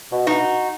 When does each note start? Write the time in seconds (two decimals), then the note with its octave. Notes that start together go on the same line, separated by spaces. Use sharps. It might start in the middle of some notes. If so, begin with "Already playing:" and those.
0.12 B2
0.27 D#4 F#4